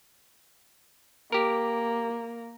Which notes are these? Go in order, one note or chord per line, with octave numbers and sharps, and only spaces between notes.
A#3 G4 A#4